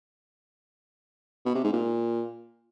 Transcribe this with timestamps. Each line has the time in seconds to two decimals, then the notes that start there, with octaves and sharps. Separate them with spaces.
1.46 B2
1.55 C3
1.64 G#2
1.73 A#2